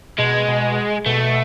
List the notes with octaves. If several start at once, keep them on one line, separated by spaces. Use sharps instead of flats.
B2 G#3
B2
B2 A3